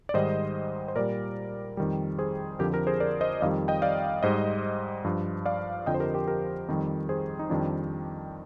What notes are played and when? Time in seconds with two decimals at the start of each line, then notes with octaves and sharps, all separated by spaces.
0.09 D5
0.14 G#2 D#3 G3 C5 D#5
0.88 C5
0.96 A#2 G3 A#4 D5
1.77 F2 D#3 G3
2.18 G#4 C5
2.59 F2 D3 F3 G4 A#4
2.74 G4 A#4
2.87 G#4 C5
3.00 A#4 D5
3.21 C5 D#5
3.41 F2 D#3 G3 D5 F5
3.68 D#5 G5
3.82 D5 F5
4.23 G#2 G3 C5 D#5
5.04 G2 F3
5.45 D5 F5
5.86 F2 D3 F3 D#5 G5
5.94 C5
6.00 G4 A#4
6.14 G4 A#4
6.28 G4 A#4
6.68 F2 D#3 G3
7.09 G#4 C5
7.39 D#4
7.50 F2 D#3 G3 D4 F4